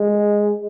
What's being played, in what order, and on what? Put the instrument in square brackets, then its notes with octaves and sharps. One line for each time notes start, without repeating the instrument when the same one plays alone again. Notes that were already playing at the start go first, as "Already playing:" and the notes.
Already playing: [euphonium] G#3